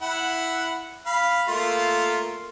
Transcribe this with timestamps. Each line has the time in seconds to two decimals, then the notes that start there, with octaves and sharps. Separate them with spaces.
0.01 E4 F#5
1.06 F5 B5
1.48 A3 A#3 F4